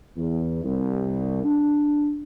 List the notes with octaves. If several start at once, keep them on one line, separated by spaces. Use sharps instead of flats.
E2
C2
D4